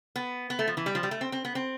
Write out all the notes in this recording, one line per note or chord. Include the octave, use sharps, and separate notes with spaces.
B3
B3
A3
F3
E3
G3
F3
G3
A3
C4
C4
B3
C4